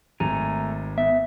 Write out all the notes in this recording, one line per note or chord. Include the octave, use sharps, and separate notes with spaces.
G#1 A3 G#5 A#5
B3 E5